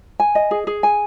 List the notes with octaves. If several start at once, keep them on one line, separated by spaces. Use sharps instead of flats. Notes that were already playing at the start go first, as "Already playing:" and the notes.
G#5
D#5
G#4
G#4
G#5